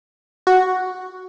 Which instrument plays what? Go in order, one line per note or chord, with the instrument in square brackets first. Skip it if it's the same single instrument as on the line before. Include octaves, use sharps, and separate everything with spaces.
[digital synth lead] F#4